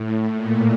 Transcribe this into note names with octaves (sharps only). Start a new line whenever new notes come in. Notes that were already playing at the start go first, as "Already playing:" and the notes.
Already playing: A2
A#2